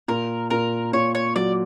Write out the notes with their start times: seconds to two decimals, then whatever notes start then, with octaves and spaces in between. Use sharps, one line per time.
0.08 A#2 A#4
0.50 A#2 A#4
0.93 A#2 C#5
1.15 C#5
1.36 F#3 D5